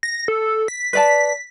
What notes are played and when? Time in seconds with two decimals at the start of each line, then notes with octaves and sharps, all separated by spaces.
0.03 A#6
0.28 A4
0.68 B6
0.93 B4 D5 A5 B6